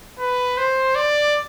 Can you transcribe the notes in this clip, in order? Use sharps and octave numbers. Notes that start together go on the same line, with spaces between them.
B4
C5
D5